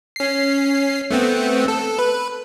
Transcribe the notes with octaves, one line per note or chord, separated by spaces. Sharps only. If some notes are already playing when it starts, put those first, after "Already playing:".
C#4 C7
A3 B3 C4
A4
B4